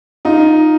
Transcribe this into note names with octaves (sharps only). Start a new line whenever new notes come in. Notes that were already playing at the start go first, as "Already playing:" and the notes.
D#4 F4